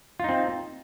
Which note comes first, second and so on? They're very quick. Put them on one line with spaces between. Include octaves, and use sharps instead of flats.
F4 D#4 C4